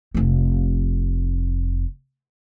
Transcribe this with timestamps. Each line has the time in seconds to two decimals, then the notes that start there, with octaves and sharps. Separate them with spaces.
0.14 F1 C4